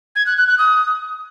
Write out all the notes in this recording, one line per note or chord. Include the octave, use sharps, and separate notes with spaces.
G#6
F#6
F#6
F#6
D#6